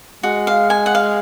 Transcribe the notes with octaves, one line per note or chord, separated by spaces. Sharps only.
G#3 F#4
F5
G#5
F#5
F5